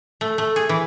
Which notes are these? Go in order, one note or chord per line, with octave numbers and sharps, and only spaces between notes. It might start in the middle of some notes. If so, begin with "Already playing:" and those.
A3
A3
G#4
E3